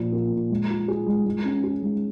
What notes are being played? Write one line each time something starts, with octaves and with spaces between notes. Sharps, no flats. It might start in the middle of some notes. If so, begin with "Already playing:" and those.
Already playing: A#2 F3
A#3
A#2
G#3
F4
G#4
G#3
G#3
C#4
G#4
G#3